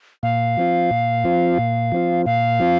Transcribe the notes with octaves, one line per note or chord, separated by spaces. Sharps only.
A#2 F5
F3 C4 F4
A#2
F3 C4 F4
A#2
F3 C4 F4
A#2 F5
F3 C4 F4